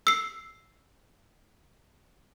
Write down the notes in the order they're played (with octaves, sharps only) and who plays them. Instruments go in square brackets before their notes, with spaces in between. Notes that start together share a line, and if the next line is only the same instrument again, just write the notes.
[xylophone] E6 C7